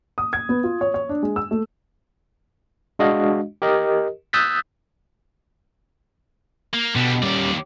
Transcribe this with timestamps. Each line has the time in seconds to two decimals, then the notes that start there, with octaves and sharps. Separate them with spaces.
0.18 D#6
0.33 G#6
0.49 B3
0.64 F4
0.81 C#5
0.94 C#5
1.09 D4
1.23 G#3
1.36 E6
1.51 A3
2.99 G#3 D4 F#4 D#5 F5
3.62 G4 A#4 D#5
4.33 D#6 E6 F#6 G6 A6 B6
6.74 A#3
6.96 B2 D3 G3
7.22 D#2 G3 C#4 D5